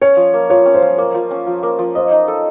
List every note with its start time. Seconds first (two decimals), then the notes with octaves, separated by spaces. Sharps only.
0.01 C#4 C#5
0.17 F3
0.34 A#3
0.50 F3 C#5
0.66 C#4
0.75 C5
0.82 F3
0.98 A#3
1.14 F3
1.31 C#4
1.47 F3
1.63 A#3
1.79 F3
1.95 C5 D#5
2.11 D#4
2.28 A4